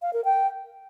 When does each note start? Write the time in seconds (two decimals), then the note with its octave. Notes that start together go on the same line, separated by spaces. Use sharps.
0.02 F5
0.13 A#4
0.25 G5